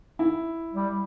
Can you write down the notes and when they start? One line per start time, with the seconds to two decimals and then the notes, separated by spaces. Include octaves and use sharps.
0.19 E4
0.74 G3